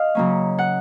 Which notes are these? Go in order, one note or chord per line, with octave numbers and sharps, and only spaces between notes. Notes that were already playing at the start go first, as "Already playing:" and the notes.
Already playing: D#5 F5
C#3 F#3 A#3 C#4
F#5